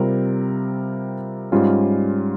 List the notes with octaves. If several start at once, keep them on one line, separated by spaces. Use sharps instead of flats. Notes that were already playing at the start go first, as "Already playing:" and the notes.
Already playing: C3 G3 C4 F4 A#4
G#2 G3 C#4 F4